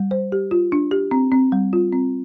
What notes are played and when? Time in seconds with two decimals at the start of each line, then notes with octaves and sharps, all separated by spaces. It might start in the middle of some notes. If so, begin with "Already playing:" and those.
Already playing: G3
0.11 C5
0.32 G4
0.51 F4
0.72 D4
0.91 G4
1.11 C4
1.32 C4
1.52 G3
1.73 F4
1.92 C4